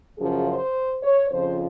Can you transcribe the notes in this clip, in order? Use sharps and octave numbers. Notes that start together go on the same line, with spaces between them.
F#2 C#3 F3 G#4
C5
C#5
F2 C#3 F3 C5